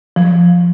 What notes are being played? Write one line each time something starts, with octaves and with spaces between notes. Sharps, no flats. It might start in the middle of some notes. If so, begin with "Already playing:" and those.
F3